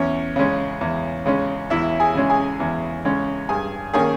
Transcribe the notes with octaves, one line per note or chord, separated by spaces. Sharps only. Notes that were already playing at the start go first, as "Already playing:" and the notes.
Already playing: E2 C#4 C#5
C#3 G#3 C#4
E2
C#3 G#3 C#4
E2 E4 E5
G#4 G#5
C#3 G#3 C#4
G#4 G#5
E2
C#3 G#3 C#4
G2 G#4 G#5
D#3 A#3 C#4 G#4 G#5